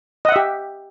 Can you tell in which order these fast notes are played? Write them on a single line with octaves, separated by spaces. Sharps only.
D#5 F#5 E5 G4